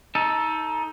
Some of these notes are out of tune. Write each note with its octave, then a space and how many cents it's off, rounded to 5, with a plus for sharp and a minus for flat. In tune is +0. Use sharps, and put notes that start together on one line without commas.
D#4 +20 A4 +0